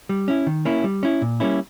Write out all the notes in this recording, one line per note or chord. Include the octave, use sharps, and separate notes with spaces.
G3
C#4 E4
D#3
A#3 C#4 E4
G3
C#4 E4
A#2
G3 A#3 C#4 E4